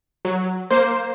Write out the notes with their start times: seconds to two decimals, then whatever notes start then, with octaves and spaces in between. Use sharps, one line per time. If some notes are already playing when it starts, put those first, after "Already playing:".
0.25 F#3
0.71 A#3 C5